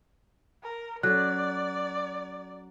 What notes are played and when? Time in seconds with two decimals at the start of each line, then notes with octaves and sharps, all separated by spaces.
0.63 A#4
1.03 F#3 C#4 A4 D5 F#6